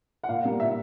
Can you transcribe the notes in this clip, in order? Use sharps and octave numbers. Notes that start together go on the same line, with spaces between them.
F#5
A#2 F5
G3 A#3
A#2 E5